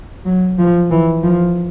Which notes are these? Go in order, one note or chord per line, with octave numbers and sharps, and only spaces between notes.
F#3
F3
E3
F3